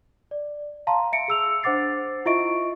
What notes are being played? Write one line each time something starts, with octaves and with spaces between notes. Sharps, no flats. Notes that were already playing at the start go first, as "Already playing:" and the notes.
D5
F5 A5 A#5 C6
E5 C#7 D7
G#4 E6 F7
D4 C5 F#5 D6 A6 C7
E4 F4 D#5 E5 C#6 D7